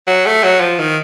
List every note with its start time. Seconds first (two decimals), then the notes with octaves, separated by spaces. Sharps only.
0.07 F#3
0.26 A3
0.44 F#3
0.61 F3
0.79 D#3